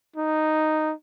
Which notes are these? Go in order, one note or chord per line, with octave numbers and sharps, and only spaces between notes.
D#4